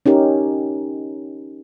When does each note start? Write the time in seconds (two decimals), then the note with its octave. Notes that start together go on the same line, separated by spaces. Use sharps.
0.06 C#4 D#4 G4 A#4